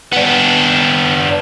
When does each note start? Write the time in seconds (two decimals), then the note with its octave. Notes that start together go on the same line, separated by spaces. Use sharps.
0.12 B3 D4